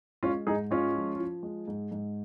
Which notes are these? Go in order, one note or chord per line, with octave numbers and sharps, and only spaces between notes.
G#3 C#4 F4
G#2 D#4 G#4
G#3 C#4 F4
F3
F3
G#3
G#2
G#2